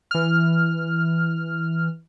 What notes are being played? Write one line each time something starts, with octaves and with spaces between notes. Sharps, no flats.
E3 F6